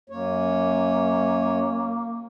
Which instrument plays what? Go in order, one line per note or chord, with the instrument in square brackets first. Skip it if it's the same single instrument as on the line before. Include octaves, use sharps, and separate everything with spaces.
[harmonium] F#2 C#5 [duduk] A#3